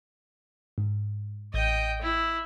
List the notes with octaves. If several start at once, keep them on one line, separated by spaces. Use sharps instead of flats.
G#2
A1 D#5 G5 G6
E4